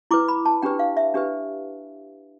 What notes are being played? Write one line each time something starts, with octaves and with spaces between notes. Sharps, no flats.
E4 B4 D6
B5
A5
D4 G4 B4 G5
F5
E5
D4 G4 B4